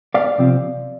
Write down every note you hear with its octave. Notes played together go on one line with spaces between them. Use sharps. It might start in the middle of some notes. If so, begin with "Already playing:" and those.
D5 F5
C3 F3 C4